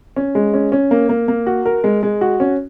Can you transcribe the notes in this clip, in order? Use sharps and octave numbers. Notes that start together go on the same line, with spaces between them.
C#4
G#3
C#4
C#4
A#3
A#3
A#3
F#4
A#4
G#3
G#3
F#4
C#4